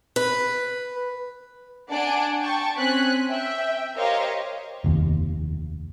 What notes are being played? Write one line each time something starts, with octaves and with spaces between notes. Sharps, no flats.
B4
D4 D5 F#5 G#5 A5 D7
G5 A5 C#6 A6
C4 C#4 G#5 F#6 B6
E5 G5
G4 A#4 C5 C#5 D#5 F5
F1 D#2